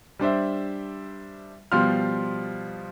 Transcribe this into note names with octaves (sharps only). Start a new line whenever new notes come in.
G3 D4 C5 E5
B2 F3 G3 F5 C6 F6